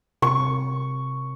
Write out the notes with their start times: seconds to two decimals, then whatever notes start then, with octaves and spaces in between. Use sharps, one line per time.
0.22 C3 C#6